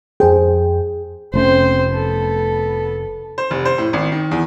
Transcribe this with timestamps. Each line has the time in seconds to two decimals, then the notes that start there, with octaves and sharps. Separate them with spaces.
0.20 F2 G#4 C5 G5
1.34 F1 A3 C4 C#4 C5
1.91 B3 A4
3.38 C5
3.51 F1
3.65 C5
3.78 A2
3.93 G#1
4.12 D#3
4.31 E2